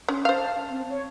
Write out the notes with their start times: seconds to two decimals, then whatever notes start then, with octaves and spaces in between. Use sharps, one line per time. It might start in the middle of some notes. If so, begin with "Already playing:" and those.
0.08 C#4 C6
0.25 C5 F5 A5
0.70 C4
0.90 C#5